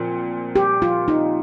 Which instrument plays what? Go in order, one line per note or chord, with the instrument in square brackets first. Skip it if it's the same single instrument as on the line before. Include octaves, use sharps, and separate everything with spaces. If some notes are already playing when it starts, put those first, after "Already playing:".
Already playing: [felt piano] A#2 F3 C4
[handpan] G4
F4
D#4